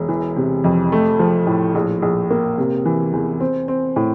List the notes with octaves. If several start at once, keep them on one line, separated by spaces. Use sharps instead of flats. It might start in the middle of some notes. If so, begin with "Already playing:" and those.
Already playing: E1
E3
C3
F2
A3
F3
A2
A#1
A#1
A#3
C3
E3
E2
C4
C4
A2